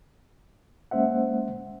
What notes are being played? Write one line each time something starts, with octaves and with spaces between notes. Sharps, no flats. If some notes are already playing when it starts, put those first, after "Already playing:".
G#3 A#3 C#4 C5 E5 F#5